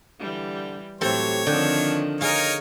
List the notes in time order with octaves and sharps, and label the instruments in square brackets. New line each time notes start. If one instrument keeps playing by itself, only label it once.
[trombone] D3 [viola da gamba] E3 G3
[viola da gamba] A2 E3 F#3 [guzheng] C4 A4 [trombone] G4 [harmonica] C#5
[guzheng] D3 G5 [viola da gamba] D#3 F3 C4 [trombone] D4
[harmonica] D#4 A#4 C#5 [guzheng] G#4 F5